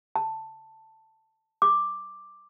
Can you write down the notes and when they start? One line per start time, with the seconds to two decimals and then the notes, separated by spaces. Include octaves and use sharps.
0.16 A5
1.62 D6